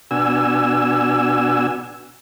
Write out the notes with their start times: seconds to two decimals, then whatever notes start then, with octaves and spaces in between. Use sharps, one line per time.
0.11 B2 D4 F#4 G#5 E6